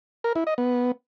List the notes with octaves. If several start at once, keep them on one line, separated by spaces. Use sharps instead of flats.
A#4
E4
D#5
B3